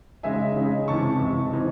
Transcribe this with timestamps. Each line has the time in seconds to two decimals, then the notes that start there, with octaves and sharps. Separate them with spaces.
0.23 C#3 G#3 D#4 E5 G#5
0.56 C#3 G#3 D#4
0.88 C#2 C3 E3 A5 C#6
1.21 C#2 C3 E3
1.53 E3 C4 D#4